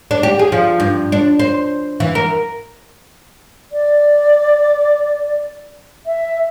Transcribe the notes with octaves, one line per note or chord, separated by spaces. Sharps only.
D4
G4
G#4
F3
G2
D4
C5
E3
A#4
D5
E5